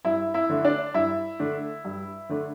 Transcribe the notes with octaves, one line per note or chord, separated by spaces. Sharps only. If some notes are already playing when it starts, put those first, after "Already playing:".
G2 E4 E5
E4 E5
D3 A3 D4
D4 D5
G2 E4 E5
D3 A3 D4
G2
D3 A3 D4